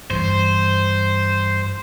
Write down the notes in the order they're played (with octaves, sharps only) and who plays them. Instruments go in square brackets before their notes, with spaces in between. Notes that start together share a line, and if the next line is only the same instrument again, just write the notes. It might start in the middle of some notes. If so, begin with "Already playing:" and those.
[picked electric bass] G2 E3 [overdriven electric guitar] C5